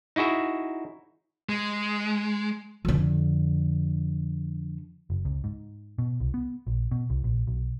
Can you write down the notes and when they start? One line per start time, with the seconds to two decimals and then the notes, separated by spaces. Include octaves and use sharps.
0.16 D#4 E4 F#4 G#4 E5
1.49 G#3
2.85 F2 D3
5.10 F#1
5.25 C#2
5.44 G#2
5.98 B2
6.20 C2
6.34 B3
6.67 A#1
6.91 B2
7.10 C2
7.24 A#1
7.47 B1